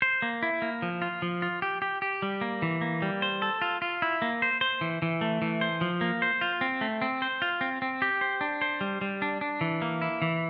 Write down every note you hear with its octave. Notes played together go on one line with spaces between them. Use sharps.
C5
A#3
E4
A#3
F3
F4
F3
F4
G4
G4
G4
G3
A#3
E3
A#3
G3
C5
A4
F4
F4
E4
A#3
C5
C5
E3
E3
A3
E3
C5
F3
A#3
C5
F4
C4
A3
C4
C5
F4
C4
C4
G4
C5
D4
C5
G3
G3
D4
D4
E3
A#3
E4
E3